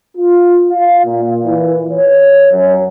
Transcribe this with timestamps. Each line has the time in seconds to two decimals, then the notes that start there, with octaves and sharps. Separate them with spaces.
0.16 F4
0.71 F5
1.06 A#2
1.44 E3
1.91 C#5
2.52 F#2